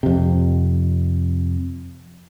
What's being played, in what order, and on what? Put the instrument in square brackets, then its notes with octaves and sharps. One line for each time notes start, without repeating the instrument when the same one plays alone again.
[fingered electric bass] F2 C3